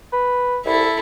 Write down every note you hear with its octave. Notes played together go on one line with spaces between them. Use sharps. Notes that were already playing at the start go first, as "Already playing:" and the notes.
B4
C2 E4 A4